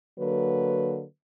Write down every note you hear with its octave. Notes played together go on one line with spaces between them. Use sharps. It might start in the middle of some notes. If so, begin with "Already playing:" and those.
D3 F#3 A#3 B4